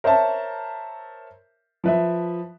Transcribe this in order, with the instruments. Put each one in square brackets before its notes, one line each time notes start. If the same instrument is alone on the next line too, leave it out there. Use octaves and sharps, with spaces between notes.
[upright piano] A#4 C5 C#5 E5 A5
F3 B4 E5